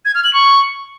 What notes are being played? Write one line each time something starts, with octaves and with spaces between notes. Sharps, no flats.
G#6
F6
F#7
C#6